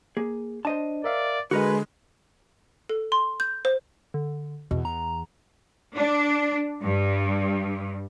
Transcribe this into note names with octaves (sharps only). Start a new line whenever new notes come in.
A#3 G#4
D4 C5 D#5 A5
A#4 D5 E5 F5
D3 G#3 F#4 A#4 B4 D#5
A4
C6
G6
C5
D3
E2 B2
A#5
D4
G2